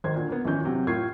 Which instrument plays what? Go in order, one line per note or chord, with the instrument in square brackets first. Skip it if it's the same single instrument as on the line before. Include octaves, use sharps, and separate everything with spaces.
[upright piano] G#1 D#3 A#4 C5 G#6
A#2 D3
A#3 B3
G#1 A#2 E3 C#4 G6
C3 F#3 C4
A2 A#3 F4 C#6 G#6 C7